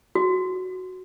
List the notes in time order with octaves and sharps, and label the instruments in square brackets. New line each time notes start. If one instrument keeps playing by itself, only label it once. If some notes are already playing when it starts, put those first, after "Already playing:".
[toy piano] F#4